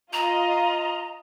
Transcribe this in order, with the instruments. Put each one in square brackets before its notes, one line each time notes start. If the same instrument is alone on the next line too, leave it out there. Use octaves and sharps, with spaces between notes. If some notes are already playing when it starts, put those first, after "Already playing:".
[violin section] F4 D#5 [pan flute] A#5